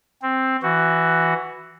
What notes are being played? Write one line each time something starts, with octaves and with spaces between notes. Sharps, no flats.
C4
E3 F#4